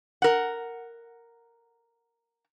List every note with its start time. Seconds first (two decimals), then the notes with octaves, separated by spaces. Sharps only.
0.22 A#4 F#5